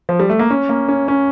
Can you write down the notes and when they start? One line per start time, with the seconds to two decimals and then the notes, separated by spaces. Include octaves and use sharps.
0.09 F3
0.20 G3
0.29 A3
0.39 A#3
0.50 C#4
0.69 A#3
0.88 C#4
1.08 C#4